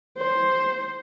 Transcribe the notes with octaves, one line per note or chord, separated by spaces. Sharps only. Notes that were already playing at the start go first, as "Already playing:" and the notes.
C5